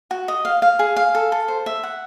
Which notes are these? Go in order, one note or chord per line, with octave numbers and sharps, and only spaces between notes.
F#4
D#5
F5
F5
G#4
F5
A4
A4
C5
E5
F#5